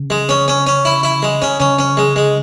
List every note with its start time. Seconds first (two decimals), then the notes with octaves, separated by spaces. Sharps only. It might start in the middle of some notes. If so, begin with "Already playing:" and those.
Already playing: C#3
0.10 G#3
0.29 C#4
0.48 C#4
0.67 C#4
0.85 E4
1.03 E4
1.23 G#3
1.42 C#4
1.60 C#3 C#4
1.79 C#4
1.97 G#3
2.16 G#3